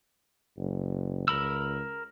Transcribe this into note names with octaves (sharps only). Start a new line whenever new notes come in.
F#1
C#2 A#4 B5 E6